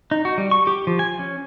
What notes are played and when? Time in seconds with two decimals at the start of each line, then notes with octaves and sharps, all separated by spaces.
0.11 D#4
0.25 F#4
0.38 G3
0.51 C#6
0.67 G4
0.87 F3
0.99 G#5
1.19 C#4